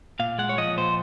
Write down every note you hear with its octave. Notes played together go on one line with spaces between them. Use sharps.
A#2 F5
G#3 F#5
C#5
F3 D#5
A#2 C5